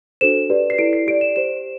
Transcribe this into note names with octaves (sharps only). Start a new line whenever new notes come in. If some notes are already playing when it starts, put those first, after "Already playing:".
D4 F#4 A4 C5 E7
G4 B4 D5
C7
E4 A4 D5 D7
C7
G4 D5 D7
E7
G4 C5 E7